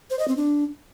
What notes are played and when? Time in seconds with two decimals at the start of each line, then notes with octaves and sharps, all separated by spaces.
0.10 C5
0.19 D#5
0.28 C4
0.37 D4